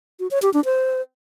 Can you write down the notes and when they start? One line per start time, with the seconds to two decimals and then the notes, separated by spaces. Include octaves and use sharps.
0.20 F#4
0.31 C#5
0.42 G4
0.54 D4
0.65 C5